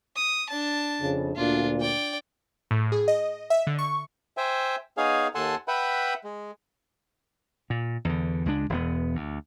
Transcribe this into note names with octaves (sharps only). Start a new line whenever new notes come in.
D#6
D4 A5
F2 C#3
D2 A#2 D4 F4
D5 G5
A2
G#4
D#5
E5
D3
C#6
C5 E5 G5 G#5
B3 D#4 G#4 C#5 F5 G#5
D#2 A4 F#5 G#5 A5 C6
B4 E5 F#5 G5 B5
G#3
A#2
E2 D3
C#2 G#3 D4
E1 E2 B3
D2